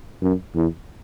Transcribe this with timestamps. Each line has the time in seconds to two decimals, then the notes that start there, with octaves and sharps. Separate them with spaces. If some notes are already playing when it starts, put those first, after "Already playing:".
0.22 F#2
0.55 E2